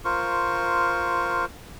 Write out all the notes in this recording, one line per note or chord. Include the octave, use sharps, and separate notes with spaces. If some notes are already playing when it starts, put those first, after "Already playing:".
F4 A#4 C5 C#6